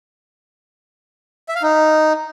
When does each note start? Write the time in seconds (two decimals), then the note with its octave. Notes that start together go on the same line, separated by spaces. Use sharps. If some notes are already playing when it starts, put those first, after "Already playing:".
1.49 E5
1.55 F5
1.62 D#4